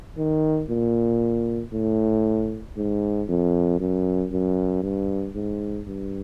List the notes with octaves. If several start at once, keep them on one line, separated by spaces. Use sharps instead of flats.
D#3
A#2
A2
G#2
F2
F#2
F#2
G2
G#2
G2